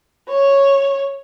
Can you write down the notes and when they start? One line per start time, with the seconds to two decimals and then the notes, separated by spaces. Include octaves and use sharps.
0.29 C#5